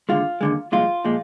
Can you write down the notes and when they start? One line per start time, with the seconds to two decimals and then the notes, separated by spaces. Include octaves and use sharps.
0.09 D#2 D3 G#3 F4
0.41 D#2 D3 G#3
0.72 C2 A#2 F3 G#3 F4
1.05 A#2 F3 G#3